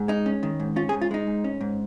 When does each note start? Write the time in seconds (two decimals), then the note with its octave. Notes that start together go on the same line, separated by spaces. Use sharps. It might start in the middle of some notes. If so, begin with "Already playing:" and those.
Already playing: G#2
0.08 G#3 D#4
0.26 C#4
0.43 D#3
0.60 G#2
0.76 C#4 F4
0.89 G#4
0.93 G#2
1.01 F4
1.11 G#3 D#4
1.27 G#2
1.44 C#4
1.61 G#2